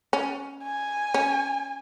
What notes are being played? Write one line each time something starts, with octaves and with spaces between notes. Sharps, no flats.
C#4
G#5
C#4